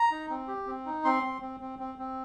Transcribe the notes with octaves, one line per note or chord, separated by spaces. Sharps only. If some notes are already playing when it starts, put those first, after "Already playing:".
Already playing: A#5
D#4
C4
G4
C4
D#4
C4 C6
C4
C4
C4
C4
C4